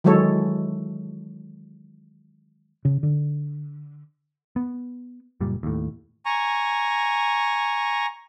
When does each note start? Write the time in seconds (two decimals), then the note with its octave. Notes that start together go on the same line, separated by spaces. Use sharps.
0.04 D#3 E3 F#3 G#3 A4 C#5
2.85 C#3
3.03 D3
4.56 B3
5.41 F#1 A#2 G3
5.63 D#2 A2
6.26 G#5 A#5 C#6